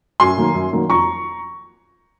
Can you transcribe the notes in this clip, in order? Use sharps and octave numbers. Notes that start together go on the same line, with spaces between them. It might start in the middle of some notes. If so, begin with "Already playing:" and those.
F#2 G#5 C6
D#3 F#3 A#3
F#2
D#3 F#3 A#3
F2 A#5 C#6